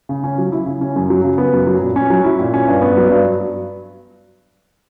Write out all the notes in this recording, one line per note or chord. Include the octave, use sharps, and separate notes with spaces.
C#3
C#4
F#3
E4
C#3
C#4
F#2
F#3
C#3
B3
F#2
F#3
A#2
C#4
F#3
E4
A#2
C#4
G2
B3
F#3
G2